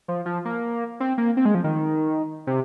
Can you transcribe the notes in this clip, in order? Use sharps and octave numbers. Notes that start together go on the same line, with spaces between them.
F3
F3
A#3
C4
A#3
C4
G#3
F3
D#3
C3